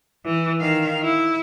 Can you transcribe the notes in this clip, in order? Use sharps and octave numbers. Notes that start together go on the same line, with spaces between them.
E3
D#3 F5
E4